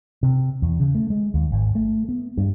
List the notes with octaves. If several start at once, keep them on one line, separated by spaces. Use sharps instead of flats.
C3
E2
C#3
A3
G#3
D#2
G#1
A3
B3
G2